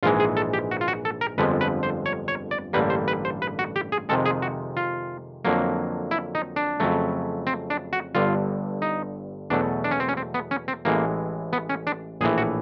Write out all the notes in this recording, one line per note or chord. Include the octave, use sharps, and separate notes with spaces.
A#1 G#2 E3 G#3 F4
G#4
A4
G4
F#4
F4
F#4
A4
A#4
G1 F2 D3 F3 G#3 B4
B4
C5
C#5
C#5
D5
A1 G2 D3 G3 A#3 B4
C5
B4
C5
B4
F#4
G4
G#4
F2 C3 D#3 G#3 A4
G#4
F#4
F4
F2 D3 F#3 A#3
E4
D#4
D4
F2 C#3 F#3 A3
C4
D4
F#4
G1 G2 D3 F4
D#4
E2 B2 F#3 A3 D4
D4
C#4
C4
C#4
C4
B3
C#4
C4
A1 A2 E3 G#3 A#3
B3
C#4
D4
A#1 A2 E3 G#4
F#4